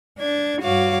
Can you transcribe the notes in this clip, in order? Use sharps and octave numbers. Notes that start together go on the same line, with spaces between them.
D4 G#6
G2 F#4 C#5 F5 D6